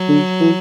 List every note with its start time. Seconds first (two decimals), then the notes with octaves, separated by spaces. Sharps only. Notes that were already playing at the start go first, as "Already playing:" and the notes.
Already playing: F#3
0.09 D3
0.40 E3